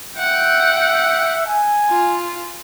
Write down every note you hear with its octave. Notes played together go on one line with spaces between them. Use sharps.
E5 F#5 G5
G#5
F4